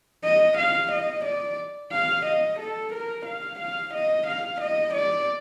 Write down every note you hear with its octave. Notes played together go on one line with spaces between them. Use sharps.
D#5
F5
D#5
D5
F5
D#5
A4
A#4
F5
F5
D#5
F5
D#5
D5